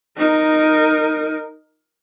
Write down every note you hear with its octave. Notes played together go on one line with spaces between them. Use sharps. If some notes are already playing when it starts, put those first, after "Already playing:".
D#4 A#4